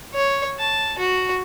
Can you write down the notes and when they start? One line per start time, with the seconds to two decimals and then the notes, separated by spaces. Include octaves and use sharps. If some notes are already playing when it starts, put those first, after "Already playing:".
0.14 C#5
0.59 A5
0.98 F#4